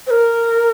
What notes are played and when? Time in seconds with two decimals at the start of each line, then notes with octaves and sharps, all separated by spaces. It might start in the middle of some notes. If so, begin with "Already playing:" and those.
0.07 C5
0.10 A#4